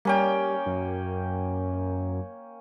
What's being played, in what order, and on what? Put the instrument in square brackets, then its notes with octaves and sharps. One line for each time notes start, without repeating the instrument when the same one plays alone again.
[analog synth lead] G3 [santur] A#3 C#4 G5
[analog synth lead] F#2